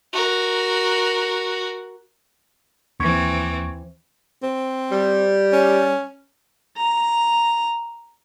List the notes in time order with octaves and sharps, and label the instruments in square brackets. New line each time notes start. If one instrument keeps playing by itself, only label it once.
[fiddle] F#4 A#4
[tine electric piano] D#2 C#6 G#6 [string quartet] E3 C4
[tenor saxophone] C4
[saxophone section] G3
[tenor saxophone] C#4
[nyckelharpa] A#5